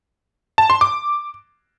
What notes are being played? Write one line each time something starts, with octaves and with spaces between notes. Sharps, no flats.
A5
C6
D6